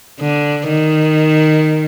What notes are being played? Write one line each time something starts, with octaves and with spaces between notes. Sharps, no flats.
D3
D#3